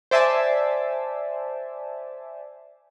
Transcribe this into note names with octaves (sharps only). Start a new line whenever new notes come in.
C5 D5 E5 G#5 A5